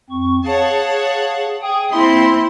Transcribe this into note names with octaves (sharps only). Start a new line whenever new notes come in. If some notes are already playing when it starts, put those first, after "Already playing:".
F2 C4 C#6
G#4 C#5 F5 F#5 A5
G#4 G5 D#6
A#3 C4 E4 C6